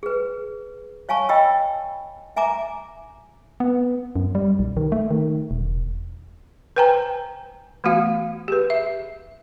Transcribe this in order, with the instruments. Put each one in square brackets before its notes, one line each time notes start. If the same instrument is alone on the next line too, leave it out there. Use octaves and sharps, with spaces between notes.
[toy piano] G#4 B4
C#5 F5 G#5 A5 C#6
D#5 G5 B5 E6
E5 G#5 A#5 D6
[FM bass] B3
F#2
G3
B1
D#3
A3
D#3
E1
[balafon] B4 C5 G5 G#5 A#5
E3 A3 B3 F#4 F5
G4 G#4 B4
E5